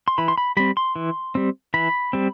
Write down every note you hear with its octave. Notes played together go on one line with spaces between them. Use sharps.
C6
E3 B5
C6
B5
G3 C4 B5
C6
E3
G3 C4
E3 B5
G3 C4